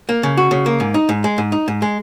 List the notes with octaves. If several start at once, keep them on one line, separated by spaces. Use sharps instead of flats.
A#3
C#3
F#4
C#3
A#3
G#2
D#4
G#2
G#3
G#2
D#4
G#2
G#3